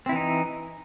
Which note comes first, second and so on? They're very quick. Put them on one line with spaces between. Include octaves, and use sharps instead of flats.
C4 E4 E3 D#4